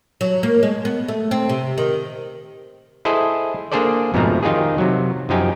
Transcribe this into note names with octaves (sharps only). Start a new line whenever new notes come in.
F#3
A#3
G#3
B3
A3
C4
C3
D#3
E4 G#4 A4 C5 D#5
A#3 D4 G#4 A4 C5 D5
F2 G#2 B2 F3 A3 A#5
D#3 D#4 F4 G4 G#4
C3 F#3
F#2 F3 D#4 G4 G#5